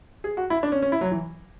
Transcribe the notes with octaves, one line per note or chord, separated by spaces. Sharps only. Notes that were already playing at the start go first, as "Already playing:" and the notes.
G#4
F#4
E4
D4
C#4
C#4
E4
F#3
E3